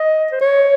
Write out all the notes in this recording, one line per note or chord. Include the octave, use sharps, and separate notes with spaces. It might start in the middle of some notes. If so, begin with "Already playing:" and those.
Already playing: D#5
C5
C#5